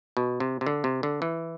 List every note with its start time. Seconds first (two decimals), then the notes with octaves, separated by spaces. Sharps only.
0.17 B2
0.40 C3
0.61 C3
0.66 D3
0.84 C3
1.03 D3
1.22 E3